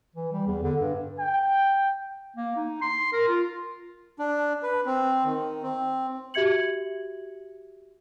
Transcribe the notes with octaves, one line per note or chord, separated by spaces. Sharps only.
E3
G3
E2
D3
G2
G5
A#3
D#4
C6
A#4
F4
D4
B4
C4
D#3
C4
F#4 G4 E5 G#6 C#7 F#7